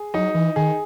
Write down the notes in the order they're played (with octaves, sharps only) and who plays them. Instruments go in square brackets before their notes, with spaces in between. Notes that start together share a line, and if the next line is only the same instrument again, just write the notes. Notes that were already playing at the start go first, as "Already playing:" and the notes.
Already playing: [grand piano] G#4
[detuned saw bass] F#3 [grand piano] D#4
[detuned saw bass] E3
[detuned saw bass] D#3 [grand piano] G#4